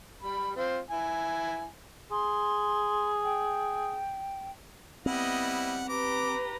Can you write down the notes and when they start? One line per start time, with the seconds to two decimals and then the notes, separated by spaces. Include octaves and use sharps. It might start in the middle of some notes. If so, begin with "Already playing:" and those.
0.23 G3 B5
0.56 C4 F4 C5
0.90 E4 G#5
2.11 G#4 C6
3.24 G5
5.06 G3 B3 C4 E4 D#5 F#5
5.89 G4 B4 A#5 D6